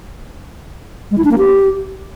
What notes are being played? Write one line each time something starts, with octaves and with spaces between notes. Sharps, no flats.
G#3
E4
D4
A#3
G4